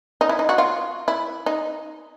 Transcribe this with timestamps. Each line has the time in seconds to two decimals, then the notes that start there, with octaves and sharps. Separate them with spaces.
0.21 D#4
0.29 E4
0.39 D#4
0.49 F#4
0.58 F4
1.08 E4
1.46 D#4